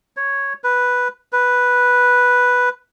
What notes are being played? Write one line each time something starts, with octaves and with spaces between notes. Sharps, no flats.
C#5
B4
B4